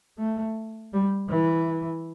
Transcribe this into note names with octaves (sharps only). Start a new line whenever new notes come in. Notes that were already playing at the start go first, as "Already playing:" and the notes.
A3
G3
E3